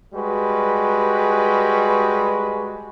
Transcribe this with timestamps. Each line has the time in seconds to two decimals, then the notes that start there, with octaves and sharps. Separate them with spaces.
0.14 G3 G#3 F#4 B4